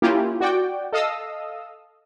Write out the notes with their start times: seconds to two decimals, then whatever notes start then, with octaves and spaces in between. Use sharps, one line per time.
0.02 A#3 C#4 E4 F4 G4
0.41 F#4 D5 G5
0.92 A4 D#5 F5 D#6 E6